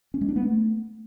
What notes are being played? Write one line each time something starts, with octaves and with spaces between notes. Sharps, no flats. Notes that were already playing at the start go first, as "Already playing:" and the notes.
C#4
G#3
D4
B3
A3